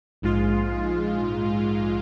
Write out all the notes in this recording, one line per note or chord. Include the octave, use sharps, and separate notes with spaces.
A#1 G#2 G#3 F4